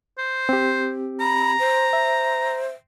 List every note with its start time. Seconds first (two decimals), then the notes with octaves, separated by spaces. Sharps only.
0.18 C5
0.49 C4 G4
1.21 A#5 B5
1.60 C5
1.93 E5